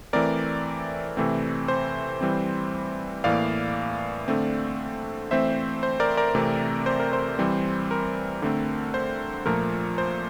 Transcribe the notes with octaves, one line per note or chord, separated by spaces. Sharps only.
E3 A3 C4 A#4 D5
C3 E3 A3 C4
C5
E3 G3 C4
A2 E3 A#3 D5 F5
D3 A3 C4
E3 A3 C4 C5 E5
C5
A#4 D5
A#4 D5
C3 E3 A3 C4
C5
A#4
C5
E3 G3 C4
A#4
D3 A3 C4
C5
A#2 F3 A3 A#4
C5